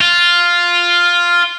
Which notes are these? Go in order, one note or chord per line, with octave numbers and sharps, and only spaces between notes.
F4